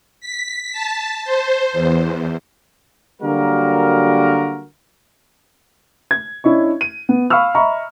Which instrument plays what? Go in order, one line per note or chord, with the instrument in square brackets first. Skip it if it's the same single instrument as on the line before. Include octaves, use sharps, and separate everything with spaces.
[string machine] B6
A5
C5
E2
[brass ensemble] D3 F#3 G3 A#3 F#4 A#4
[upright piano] G#6
C#4 D4 E4 D#5 C#6
D#7
B3
F5 B5 C#6 E6 F6
D#5 E5 A#5 B5 C#6